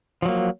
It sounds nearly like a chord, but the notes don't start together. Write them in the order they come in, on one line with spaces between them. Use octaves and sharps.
F3 F#3 A#3